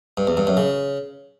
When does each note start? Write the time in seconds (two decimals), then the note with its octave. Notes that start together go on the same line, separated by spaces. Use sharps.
0.17 G2
0.27 E2
0.37 G2
0.47 F#2
0.57 C#3